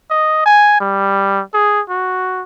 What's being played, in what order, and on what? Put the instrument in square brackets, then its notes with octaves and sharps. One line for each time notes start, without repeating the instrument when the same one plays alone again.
[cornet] D#5
G#5
G3
G#4
F#4